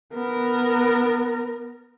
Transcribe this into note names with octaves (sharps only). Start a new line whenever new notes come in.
B3 A#4